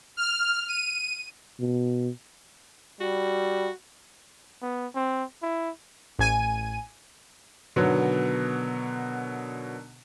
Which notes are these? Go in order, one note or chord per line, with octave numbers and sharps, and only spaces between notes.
F6
D#7
B2
G3 F#4
B3
C4
E4
A1 G#5 D#7
B2 D3 D#3 F#3 B3